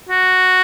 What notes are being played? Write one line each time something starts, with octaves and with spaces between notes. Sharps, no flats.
F#4